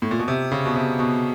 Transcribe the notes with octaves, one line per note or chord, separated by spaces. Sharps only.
A2
A#2
B2
C3
C#3
B2
C3
B2